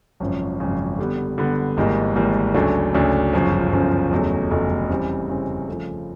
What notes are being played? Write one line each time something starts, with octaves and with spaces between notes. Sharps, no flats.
G#1 F#2 C#3 F3
G#1 F#2 C#3 F3
D3 G3 B3
D3 G3 B3
G#1 G#2 E3 G3 A#3
G#1 G#2 E3 G3 A#3
D2 C#3 F#3 A3 D4
D2 C#3 F#3 A3 D4
G1 F#2 C#3 F3
G1 F#2 C#3 F3
F1 E2 C#3 F#3 A3
F1 E2 C#3 F#3 A3
C#3 E3 G3 C4
C#3 E3 G3 C4
C#3 F3 A3